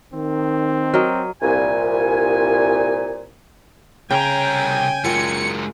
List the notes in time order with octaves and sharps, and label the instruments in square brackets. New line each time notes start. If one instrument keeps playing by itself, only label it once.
[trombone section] D#3 [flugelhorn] C4
[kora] F#3 A#4 D#5
[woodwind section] C2 A#2 G#5
[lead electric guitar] C2 A#5 [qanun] C#3 [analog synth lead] G5 [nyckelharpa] G#5
[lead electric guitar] F#2 G#3 [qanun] F4 A#4 G5 [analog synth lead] C#7